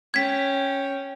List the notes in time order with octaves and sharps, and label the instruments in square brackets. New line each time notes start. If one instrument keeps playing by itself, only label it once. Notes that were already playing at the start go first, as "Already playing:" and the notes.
[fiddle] C#4 G5 [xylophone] G#6 B6